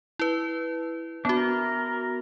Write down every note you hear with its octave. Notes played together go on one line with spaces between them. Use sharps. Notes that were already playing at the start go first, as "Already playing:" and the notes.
E4 B4
B3 D4 F#4
A#4